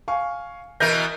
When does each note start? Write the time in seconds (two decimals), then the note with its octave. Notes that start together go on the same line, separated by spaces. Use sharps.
0.08 F5 G#5 C#6
0.80 B2 E3 A#4 E5 G6 A#6